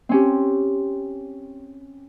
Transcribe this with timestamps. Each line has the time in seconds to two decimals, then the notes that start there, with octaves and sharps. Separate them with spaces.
0.09 C4 C#4 G4